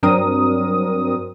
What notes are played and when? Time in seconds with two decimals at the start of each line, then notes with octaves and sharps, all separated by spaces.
0.03 G2 F#3 C4 D4 A#4 D#6